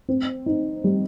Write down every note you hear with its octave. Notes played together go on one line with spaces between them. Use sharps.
C4
D#4
G3